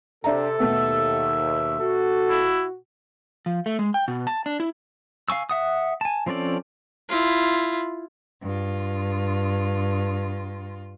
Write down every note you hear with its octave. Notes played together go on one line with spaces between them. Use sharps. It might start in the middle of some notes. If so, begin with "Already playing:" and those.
C3 D4 A4 E5 A#5
D#2 B2 A3 B3 E5
F#4 A4
E4
F3
A3
G#3
G5
B2
A5
D4
E4
F5 G#5 C#6 E6
E5 F#5 D#6
G#5 A5
F3 C4 C#4 A4 D5
E4 F4
G2 F4